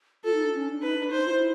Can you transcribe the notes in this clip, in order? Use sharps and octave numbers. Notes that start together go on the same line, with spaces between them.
F4 A4
D#4
D4
C#4
D4
D#4 B4
D4
D#4 C5
F4
E4